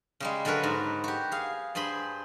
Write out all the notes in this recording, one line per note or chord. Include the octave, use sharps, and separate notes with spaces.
C#3 G3 G#3
D3 F#3 F#4 A#4 B4
G#2
F#4 G4
G#4 F5
G2 G#4 C5 B5 C6